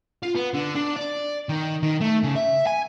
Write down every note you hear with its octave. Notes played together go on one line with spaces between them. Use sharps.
F4
B3
D3
D4
D5
D#3
D#3
A3
C#3
E5
G#5